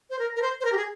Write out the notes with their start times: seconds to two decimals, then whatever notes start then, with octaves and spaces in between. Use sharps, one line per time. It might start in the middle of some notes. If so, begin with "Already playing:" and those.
0.10 C5
0.19 A#4
0.36 A#4
0.42 C5
0.60 C5
0.65 A#4
0.72 G4
0.77 G#4